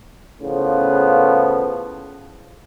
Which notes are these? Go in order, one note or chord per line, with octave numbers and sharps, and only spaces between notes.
A2 C#3 F3 B3